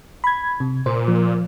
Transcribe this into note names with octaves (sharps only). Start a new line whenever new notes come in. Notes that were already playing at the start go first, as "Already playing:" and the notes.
B5 G#6
C3
A#2 C5
F3